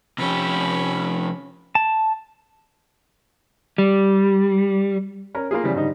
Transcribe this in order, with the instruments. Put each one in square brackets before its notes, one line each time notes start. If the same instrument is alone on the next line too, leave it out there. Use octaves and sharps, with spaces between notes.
[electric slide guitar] C3 F3 G4 [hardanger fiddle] C#4 B5
[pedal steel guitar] A5
[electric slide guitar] G3
[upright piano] C#4 A#4 A#5
A#3 F4 G#4
C#3 E3 F3 G3 G#4
G#2 D3 G3 D#4